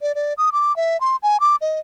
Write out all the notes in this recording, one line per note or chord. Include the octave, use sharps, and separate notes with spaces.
D5
D5
D#6
D6
E5
C6
G#5
D6
D#5